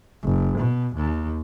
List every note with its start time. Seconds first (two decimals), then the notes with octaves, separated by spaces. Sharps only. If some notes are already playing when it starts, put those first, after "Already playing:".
0.24 F#1
0.58 B2
0.96 D#2